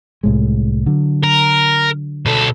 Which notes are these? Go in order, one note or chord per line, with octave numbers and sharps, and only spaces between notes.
C2 A2 G#3
D3 F#3
A#4
B2 A4